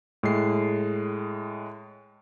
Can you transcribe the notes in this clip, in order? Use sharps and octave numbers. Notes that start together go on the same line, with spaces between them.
A2 G#3 C7